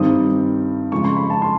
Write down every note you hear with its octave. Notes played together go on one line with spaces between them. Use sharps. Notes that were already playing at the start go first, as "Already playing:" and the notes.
Already playing: G2 D#3 G3 C4 D#6
C#3 F3 G#3 C#6
C6
B5
A5
C6